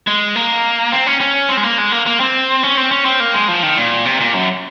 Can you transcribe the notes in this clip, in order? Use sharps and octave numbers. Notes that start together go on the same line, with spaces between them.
G#3
A#3
C4
C#4
C#4
C4
G#3
A#3
G#3
A#3
A#3
C4
C#4
C4
C#4
C4
A#3
G#3
F3
D#3
A#2
C3
A#2
F#2